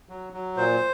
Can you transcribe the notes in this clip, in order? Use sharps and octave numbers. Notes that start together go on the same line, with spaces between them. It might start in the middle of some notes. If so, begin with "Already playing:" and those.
F#3
F#3
A#2 C5